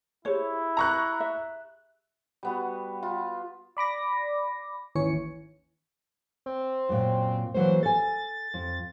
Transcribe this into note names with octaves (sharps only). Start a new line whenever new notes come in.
E4 G4 G#4 C5 C#5
A#5 C#6 F#6
E5
G3 B3 F#4
F4
D5 B5 D6 A#6
G#1 D#2 E3 C#4 C#5 C#7
C4
F#2 A#2
E3 F#3 A#3 C5
A4 G#5 A6
F2